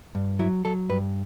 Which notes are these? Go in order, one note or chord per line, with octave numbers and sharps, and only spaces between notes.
G2
F#3 E4
F#3 A4
G2 B4